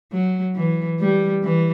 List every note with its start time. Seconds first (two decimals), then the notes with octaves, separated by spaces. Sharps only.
0.12 F#3
0.56 E3
1.00 G3
1.44 E3